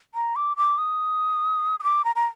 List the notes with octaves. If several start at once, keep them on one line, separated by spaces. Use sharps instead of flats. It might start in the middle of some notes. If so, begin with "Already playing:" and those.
A#5
D6
D6
D#6
D#6
D6
A#5
A#5